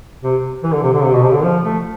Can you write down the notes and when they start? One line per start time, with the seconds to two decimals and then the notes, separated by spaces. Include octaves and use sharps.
0.23 C3
0.63 E3
0.73 D3
0.83 C3
0.94 D3
1.04 C3
1.14 B2
1.23 C3
1.33 D3
1.44 F3
1.64 A3